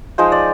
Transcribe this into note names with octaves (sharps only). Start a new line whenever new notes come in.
F3 G#3 D#4 C5
D5